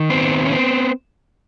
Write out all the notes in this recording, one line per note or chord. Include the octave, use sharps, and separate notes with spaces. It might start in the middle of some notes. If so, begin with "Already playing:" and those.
Already playing: D#3
B3 C4
C#4
B3 C4